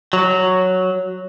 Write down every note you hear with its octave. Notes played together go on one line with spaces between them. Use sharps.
F#3